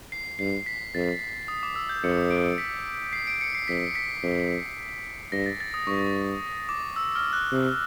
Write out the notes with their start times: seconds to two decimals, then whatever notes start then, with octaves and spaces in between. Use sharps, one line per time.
0.12 C7
0.39 G2 C7
0.66 B6
0.94 F2 A6
1.48 D#6
1.63 D6
1.76 E6
1.89 G6
2.04 F2 C#7
2.30 D7
2.58 B6
3.13 C7
3.27 D7
3.41 C#7
3.55 C7
3.68 F2 B6
3.95 B6
4.23 F2
5.32 G2 A#6
5.46 A6
5.60 A6
5.74 D#6
5.87 G2 C#6
6.69 D6
6.96 E6
7.15 F6
7.33 F#6
7.52 C3